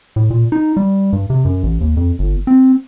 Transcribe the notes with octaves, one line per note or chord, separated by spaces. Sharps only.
A2
A#2
D#4
G3
G2
C3
F#2
A1
D#2
F2
G1
C4